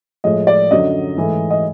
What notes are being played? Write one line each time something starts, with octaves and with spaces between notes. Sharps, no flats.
A2 F3 G#3 D#5
D5
F#2 D3 F#3 D#5
G#2 E3 A3
D#5